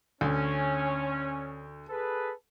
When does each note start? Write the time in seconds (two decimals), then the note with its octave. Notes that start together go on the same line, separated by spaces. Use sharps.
0.21 D2 C#4
1.90 G#4 A4 B4